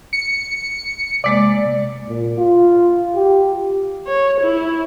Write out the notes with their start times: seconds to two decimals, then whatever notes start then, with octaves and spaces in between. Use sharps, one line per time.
0.13 C#7
1.24 C3 G#3 A#3 D5
2.08 A#2
2.37 F4
3.15 G4
4.06 C#5
4.41 E4